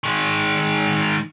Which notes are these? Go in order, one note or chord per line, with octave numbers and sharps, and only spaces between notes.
D#3 G#3